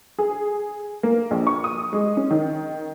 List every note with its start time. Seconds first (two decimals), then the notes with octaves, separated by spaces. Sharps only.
0.19 G#4
1.03 A#3
1.31 A#1
1.47 C#6
1.64 D#6
1.93 G#3
2.17 C#4
2.31 D#3